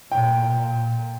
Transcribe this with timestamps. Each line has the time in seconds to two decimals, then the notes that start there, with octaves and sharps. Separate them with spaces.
0.11 A#2 G5
0.55 A#2